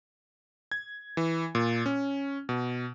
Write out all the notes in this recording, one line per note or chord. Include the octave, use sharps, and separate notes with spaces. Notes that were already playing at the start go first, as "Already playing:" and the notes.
G#6
E3
A#2
C#4
B2